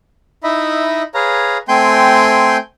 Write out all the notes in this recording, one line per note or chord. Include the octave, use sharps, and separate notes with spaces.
D#4 E4 D#5 E5 B5
G#4 B4 C#5 F5 A#5
A3 C4 G5 G#5 C6 G6